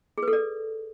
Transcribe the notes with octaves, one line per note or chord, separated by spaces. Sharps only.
G#4
B4
A4
D5